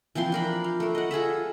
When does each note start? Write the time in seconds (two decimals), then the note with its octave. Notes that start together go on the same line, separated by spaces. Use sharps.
0.15 E3 F3 C4 C6
0.32 D4 A#4 B5
0.64 F5
0.80 A3 A#4
0.95 D#5 F#5
1.11 F4 G#4 A4 E5